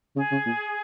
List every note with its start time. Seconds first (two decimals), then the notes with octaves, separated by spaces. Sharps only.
0.16 C#3 G#4
0.31 C#3
0.46 A#2